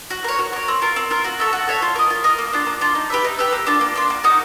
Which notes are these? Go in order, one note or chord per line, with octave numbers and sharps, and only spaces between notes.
F#4
A#4 C#5
F#4
A#4 C#5
C4
F4 A#4
C4
F4 A#4
F#4
A4 C#5 E5
F#4
A4 C#5 E5
F4
A#4 D#5
F4
A#4 D#5
A#3
D4 F4
A#3
D4 F4
D#4
G4 B4 E5
D#4
G4 B4 E5
A#3
D4 F4
A#3
D4 F4
A#3
D#4 F#4 A#4